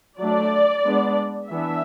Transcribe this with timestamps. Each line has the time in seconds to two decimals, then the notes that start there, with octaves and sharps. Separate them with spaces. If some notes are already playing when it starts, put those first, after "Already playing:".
0.20 F#3 A3 D4 D5
0.85 G#3 B3 D4
1.50 E3 B3 D4 E5